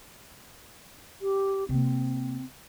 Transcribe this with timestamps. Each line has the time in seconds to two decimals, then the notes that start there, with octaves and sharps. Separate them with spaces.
1.21 G4
1.69 C3 A#3 C4